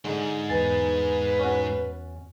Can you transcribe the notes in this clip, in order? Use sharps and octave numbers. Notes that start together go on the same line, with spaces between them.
G#2 D3 G#3
E2 B4 G#5 A6
C#4 F#4